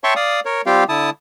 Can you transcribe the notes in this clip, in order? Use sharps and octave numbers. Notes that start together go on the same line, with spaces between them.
C#5 E5 G5 A5 C6 C#6
D5 F5 D#6
A#4 C#5
G3 C4 F4 G4 F5 G5
D3 E4 A5 D#6